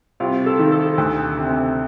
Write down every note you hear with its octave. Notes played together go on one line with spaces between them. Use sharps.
C2 F4
A4
D#3
A4
D2
C3